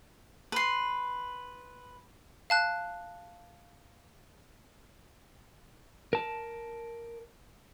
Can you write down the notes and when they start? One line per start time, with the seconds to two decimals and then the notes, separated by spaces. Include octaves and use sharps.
0.52 B4 C6
2.50 F5 A5 F#6
6.13 A#4 A5